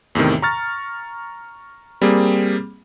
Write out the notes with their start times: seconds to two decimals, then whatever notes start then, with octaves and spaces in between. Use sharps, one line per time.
0.15 E2 A2 C3 D#3
0.42 A#5 C#6 F6 A6
2.02 G3 A#3 C4 G#4